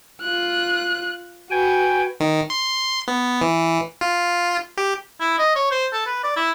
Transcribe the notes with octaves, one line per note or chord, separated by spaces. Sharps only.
F4 F#6
F#4 B4 G5 G#5
D#3
C6
B3
E3
F4
G4
E4
D#5
C#5
C5
A4
B4
D5
E4